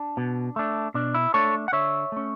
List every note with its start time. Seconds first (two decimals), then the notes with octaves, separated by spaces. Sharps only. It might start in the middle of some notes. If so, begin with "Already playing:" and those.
Already playing: D4
0.17 B2
0.56 A3 D4
0.94 B2 D4
1.14 E4
1.34 A3 D4 A4 C#5
1.68 F#5
1.72 D3 C#5 E5
2.12 A3 C#4